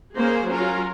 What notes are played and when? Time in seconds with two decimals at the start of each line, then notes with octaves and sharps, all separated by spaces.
0.16 A#3 C#4 G#4 C5
0.47 F#3 C#4 F4 A#4